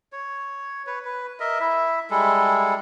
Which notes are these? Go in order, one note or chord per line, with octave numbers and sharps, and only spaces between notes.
C#5
B4 C#5
B4
A#4 D#5 E5
E4 E5
G3 G#3 E4 A4